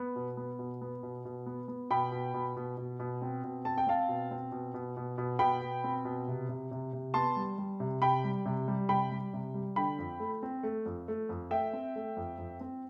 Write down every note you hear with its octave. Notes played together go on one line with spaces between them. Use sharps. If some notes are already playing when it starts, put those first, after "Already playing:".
Already playing: B3
B2
B3
B2
B3
B2
B2
B3
B3
B2 G5 B5
B2
B2
B2
B2
B2
C4
B2
C4 A5
G5
C4 F5 A5
B2
C4
B2
B2
B2
B2
B2 G5 B5
B2
C4
B2
C3
C3
C3
C3
B3 A5 C6
G3
G3
C3
C3 G5 B5
G3
C3
G3
C3 G5 B5
G3
C3
G3
D3 G5 B5
F2
A3
C4
A3
F2
A3
F2
A3 E5 G5
C4
A3
F2
F2
C4